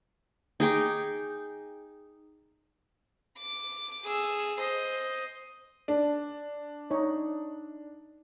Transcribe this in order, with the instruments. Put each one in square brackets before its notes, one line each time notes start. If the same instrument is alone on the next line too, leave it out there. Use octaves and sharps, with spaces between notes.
[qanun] D#4 G#4 G5 D6
[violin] D6
G#4 E6
C5 D#5
[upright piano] D4
[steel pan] D#4 C#5